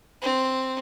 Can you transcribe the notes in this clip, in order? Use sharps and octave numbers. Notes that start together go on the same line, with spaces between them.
C4